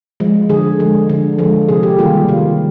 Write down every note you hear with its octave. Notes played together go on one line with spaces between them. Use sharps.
F3 G#3
D3 G#4
F3 G#3
D3
F3 G#3
C3 G#4
G4
D#3 G3 A#3 F4
C3 F4